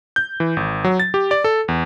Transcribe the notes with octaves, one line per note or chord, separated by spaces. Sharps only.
G6
E3
G#1
F#3
A6
G4
D5
A4
E2